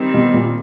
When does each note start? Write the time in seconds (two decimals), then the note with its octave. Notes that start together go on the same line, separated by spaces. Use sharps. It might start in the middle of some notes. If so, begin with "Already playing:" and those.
Already playing: D#3 G3 C4
0.14 B2
0.34 A#2